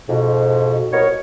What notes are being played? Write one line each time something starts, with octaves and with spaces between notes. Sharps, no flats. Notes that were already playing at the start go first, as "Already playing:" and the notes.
F2 G#2 B2
C2 B2 A#4 C#5